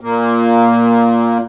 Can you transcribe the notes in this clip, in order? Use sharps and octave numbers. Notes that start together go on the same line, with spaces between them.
A#2 A#3